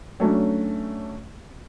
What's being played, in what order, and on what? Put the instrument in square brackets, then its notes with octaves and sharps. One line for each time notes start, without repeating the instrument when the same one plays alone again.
[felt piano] F#3 A3 C#4 D4